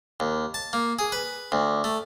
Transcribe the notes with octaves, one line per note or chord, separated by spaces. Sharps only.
D#2
A5
A#3
G#4
B4
D2
A3